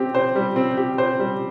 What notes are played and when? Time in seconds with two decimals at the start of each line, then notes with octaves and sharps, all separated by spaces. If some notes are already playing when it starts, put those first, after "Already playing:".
Already playing: C4 G4
0.15 C5
0.35 G3
0.56 C4
0.77 G4
0.98 C5
1.19 G3